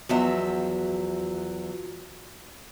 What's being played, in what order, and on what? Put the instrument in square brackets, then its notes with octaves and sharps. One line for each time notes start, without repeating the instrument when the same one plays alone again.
[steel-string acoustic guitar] E2 F3 F#3 E5